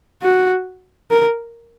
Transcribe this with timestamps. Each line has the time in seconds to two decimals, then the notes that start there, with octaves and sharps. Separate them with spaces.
0.23 F#4
1.11 A#4